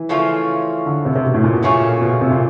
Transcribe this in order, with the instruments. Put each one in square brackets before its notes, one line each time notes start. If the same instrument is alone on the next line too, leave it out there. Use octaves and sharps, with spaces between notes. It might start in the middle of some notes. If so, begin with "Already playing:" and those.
Already playing: [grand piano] E3
[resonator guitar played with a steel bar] C#3 F3 A3 C#4 F4
[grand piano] D3
C3
C3
B2
A2
A#2
B2
[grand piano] A#2 [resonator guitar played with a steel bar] C#3 F3 A3 C#4 F4
[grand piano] B2
C3
A#2